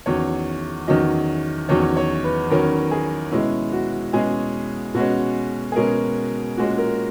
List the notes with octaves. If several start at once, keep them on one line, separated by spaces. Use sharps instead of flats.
E2 D#3 F#3 C#4 C#5
E2 D#3 F#3 C#4 D#5
E2 D#3 F#3 C#4 C#5
C#5
B4
E2 D#3 F#3 C#4 A#4
G#4
B2 G#3 C#4 E4
F#4
B2 G#3 C#4 G#4
B2 G#3 C#4 F#4
G#4
B2 G#3 C#4 A#4
A#2 G#3 C#4 F#4
A#4